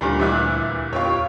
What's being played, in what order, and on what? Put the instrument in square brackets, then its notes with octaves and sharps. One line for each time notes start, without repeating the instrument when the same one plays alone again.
[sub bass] D2 [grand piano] A#2 D3 G3 [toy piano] E4 G4 C5
[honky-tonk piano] E3 E5 F#6 [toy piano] A#4 F#5 D6
[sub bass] E2 [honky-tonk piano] F4 G4 C#5 [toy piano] A#4 B4 C#6